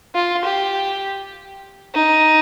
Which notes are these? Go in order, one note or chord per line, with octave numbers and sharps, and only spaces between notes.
F4
G4
D#4